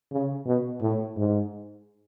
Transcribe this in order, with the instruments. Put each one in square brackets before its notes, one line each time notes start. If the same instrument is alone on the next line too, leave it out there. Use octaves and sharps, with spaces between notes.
[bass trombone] C#3
B2
A2
G#2